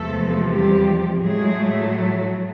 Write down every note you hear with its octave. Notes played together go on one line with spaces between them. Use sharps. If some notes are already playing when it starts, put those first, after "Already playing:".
Already playing: E2 C3 F3 G#3 A3 A4
G3 G4
A2 F#3 G#3 A3 G#4